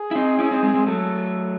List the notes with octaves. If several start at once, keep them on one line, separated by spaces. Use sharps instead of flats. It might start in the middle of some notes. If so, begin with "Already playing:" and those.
Already playing: G#4
E4
C4 D#4
C#4 E4
C4 D#4
G#3 C4
G#3 C4
F#3 A3 A4